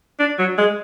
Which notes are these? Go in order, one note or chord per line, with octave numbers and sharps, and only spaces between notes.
D4
F#3
G#3